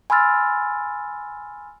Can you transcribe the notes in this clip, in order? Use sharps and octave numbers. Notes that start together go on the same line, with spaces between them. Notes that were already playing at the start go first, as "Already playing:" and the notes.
G#5 B5 C6 E6 F6 A6